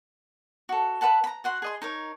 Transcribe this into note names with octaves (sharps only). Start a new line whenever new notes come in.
F#4 A4
B4 E5 F#5 A5
A#5 B5
F#4 F#5 C6
G#4 D#5 C6
D#4 A#4 C#5